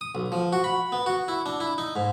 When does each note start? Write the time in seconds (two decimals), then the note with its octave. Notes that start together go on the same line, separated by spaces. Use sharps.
0.01 D#6
0.15 B1
0.32 F3
0.53 F#4
0.64 B5
0.92 B3
1.06 F#4
1.28 E4
1.46 D4
1.60 E4
1.78 D#4
1.96 G#2